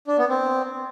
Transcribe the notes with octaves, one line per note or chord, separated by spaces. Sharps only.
D4
B3
C4